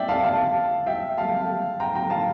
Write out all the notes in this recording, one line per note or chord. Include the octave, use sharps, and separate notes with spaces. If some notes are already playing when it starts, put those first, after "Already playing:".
Already playing: D5 E5 G5
F5 A5
F5 A5
E5 G5
F5 A5
G5 A#5
G5 A#5
F5 A5